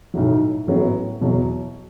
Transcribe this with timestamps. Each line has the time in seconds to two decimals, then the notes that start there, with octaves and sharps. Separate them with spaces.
0.14 B1 A2 F#3
0.67 A1 A2 F#3 B3
1.21 E2 B2 F#3